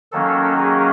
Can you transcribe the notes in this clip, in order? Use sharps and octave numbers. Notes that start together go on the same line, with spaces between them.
D#3 F#3 A#3 C#4 A4
G#4